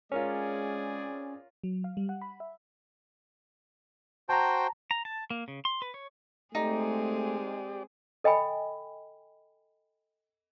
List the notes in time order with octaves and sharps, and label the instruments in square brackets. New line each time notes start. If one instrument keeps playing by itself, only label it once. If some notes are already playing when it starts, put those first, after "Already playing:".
[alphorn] G#3 [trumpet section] C4 G#4 D5 [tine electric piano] C#4 [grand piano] F4 A#4 C#5
[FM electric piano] F#3
F5
G3
F#5
B5
E5
[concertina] F#4 C5 G5 [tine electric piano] A5 A#5
[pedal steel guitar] A#5
A5
A#3
C#3
C6
B4
C#5
[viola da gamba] G#3 C4 G#4 [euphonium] A3 [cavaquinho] D#4 [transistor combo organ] G4 D5
[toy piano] A4 D#5 G5 G#5 B5